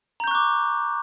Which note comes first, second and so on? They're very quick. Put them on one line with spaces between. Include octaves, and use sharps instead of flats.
A#5 G6 C#6 F#6 D6